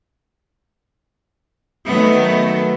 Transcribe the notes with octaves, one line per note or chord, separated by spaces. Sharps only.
D#3 F#3 A3 B3